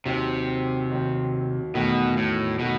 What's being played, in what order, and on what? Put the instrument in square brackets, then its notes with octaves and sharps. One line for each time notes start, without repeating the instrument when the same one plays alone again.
[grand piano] D#2 D#3 F#3 [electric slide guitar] C3
[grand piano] D#2 D#3 F#3
[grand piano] E2 D#3 F#3 A3 [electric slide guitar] B2
[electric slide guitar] A2
[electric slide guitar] B2 [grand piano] D#3 F#3 A3